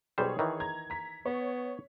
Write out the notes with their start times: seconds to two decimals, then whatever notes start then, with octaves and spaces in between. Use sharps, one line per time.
0.18 B1 G3 G#4 C5 C#5
0.39 D#3 E3
0.60 A#5 G#6
0.90 A#5 B6
1.26 B3 C#5